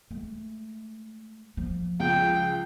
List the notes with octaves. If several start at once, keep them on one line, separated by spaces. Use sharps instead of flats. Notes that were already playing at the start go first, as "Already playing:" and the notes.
G#3 A3
F3
C#2 G5